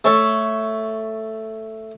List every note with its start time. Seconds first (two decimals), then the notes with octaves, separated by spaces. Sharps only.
0.04 A3 A4 C#5 E5 A5